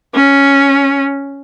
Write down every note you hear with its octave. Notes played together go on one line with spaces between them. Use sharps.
C#4